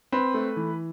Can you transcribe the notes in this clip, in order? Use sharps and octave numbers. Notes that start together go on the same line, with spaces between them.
C4 B4
A3
E3